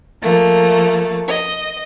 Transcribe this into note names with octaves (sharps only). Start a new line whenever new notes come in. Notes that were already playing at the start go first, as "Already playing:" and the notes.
F3 A3 A#3
D#5